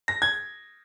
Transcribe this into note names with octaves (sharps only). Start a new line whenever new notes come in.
A#6
G#6